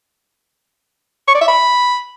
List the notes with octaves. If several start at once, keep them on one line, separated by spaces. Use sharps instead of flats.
C#6
D5
E5
B5